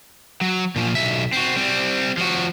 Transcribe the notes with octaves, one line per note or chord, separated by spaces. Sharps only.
F#3
A#2 F3
B1 E5
C4 F#4
G3 C4
F3 F#4